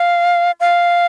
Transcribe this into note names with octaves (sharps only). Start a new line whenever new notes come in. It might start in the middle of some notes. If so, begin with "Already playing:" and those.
Already playing: F5
F5